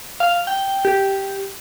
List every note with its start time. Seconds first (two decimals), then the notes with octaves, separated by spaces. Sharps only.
0.20 F5
0.47 G5
0.85 G4